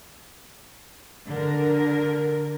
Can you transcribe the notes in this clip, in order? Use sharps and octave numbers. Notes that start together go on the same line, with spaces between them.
D3 A#4